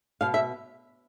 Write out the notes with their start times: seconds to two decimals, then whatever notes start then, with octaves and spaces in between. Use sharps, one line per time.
0.21 B2 F5
0.34 E5